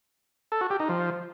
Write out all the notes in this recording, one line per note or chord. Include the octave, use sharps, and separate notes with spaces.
A4
F#4
G4
D#4
F3